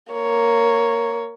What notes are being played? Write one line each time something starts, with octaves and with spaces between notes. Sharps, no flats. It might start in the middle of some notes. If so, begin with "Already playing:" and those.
A#3 C#5